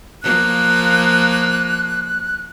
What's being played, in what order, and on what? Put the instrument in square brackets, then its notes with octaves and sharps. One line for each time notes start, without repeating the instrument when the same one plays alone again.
[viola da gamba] F3 A#3 [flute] F#6